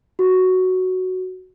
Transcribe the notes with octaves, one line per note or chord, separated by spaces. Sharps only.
F#4